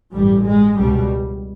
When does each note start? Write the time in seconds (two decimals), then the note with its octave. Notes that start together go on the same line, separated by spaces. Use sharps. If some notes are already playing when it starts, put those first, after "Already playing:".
0.12 A1 G2 G3
0.45 G#3
0.78 C#2 B2 G3